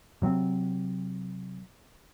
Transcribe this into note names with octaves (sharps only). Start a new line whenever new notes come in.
C3 F#3 C4